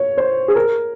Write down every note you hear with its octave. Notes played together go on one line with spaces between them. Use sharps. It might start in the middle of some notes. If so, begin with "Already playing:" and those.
Already playing: C#5
C5
G#4
A#4